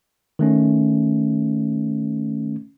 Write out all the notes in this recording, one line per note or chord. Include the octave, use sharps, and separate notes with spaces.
D#3 A3 C#4